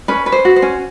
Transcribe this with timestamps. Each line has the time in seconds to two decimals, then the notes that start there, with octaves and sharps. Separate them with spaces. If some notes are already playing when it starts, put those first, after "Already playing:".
0.08 C#4 B4
0.26 B4
0.32 C5
0.45 F#4
0.56 C5
0.62 C#4